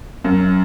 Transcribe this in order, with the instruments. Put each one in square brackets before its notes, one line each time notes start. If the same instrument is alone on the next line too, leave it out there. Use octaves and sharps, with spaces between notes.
[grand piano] F#2